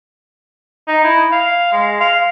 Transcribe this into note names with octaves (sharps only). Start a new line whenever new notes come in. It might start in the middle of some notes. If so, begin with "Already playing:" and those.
D#4
E4
F5
G#3
F5